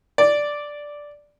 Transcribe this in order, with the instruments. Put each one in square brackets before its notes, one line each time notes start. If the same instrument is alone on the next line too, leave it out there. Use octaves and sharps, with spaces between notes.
[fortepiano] D5